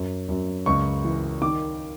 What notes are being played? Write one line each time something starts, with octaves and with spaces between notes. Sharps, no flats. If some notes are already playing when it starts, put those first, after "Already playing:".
Already playing: F#2
F#2
C#2 C#6
E3
D#3 D6